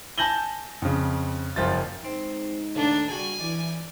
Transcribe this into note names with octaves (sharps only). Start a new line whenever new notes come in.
G#5 A5 G6 A#6 F#7 G7
F2 C#3
F#1 F3 F4 A6
G#3 C4 D#4
A#1 D#2 A3 D4
G3 F#4 G#4 G#5
E3 D5